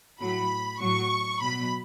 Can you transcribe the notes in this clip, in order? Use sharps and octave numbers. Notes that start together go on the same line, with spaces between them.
A2 F#3 B5
A2 F#3 C#6
B2 F#3 B5